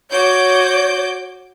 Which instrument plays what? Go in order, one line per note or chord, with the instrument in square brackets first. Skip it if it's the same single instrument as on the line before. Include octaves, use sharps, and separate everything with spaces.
[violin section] F#4 D6 G6 [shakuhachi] C#5